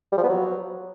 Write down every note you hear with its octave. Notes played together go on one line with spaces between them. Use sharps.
G3
F3
B3
F#3